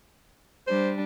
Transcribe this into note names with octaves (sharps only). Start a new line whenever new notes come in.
G3 D4 C5